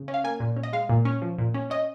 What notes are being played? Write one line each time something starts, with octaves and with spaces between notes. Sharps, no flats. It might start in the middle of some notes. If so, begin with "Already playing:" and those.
Already playing: C#3
C#4
F5
A#3 G#5
A#2
C#4
D#5
G#3 F5
A#2
C#4
F3
A#2
C#4
C#4 D#5